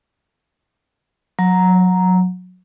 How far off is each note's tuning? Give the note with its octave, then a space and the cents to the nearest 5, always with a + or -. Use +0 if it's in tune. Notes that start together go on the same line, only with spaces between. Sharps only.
F#3 -20 A#5 +0